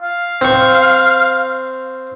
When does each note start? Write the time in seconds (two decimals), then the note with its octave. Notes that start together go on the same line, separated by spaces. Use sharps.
0.02 F5
0.41 C4 C#6